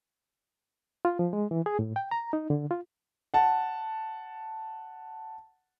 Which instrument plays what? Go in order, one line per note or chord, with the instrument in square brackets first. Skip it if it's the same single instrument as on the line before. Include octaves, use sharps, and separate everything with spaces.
[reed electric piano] F4
F3
G#3
E3
G#4
A2
G5
A#5
D#4
D3
F4
[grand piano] F#5 A5